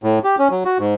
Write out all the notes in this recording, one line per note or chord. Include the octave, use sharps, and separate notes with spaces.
A2
G4
C#4
F#3
F#4
G#2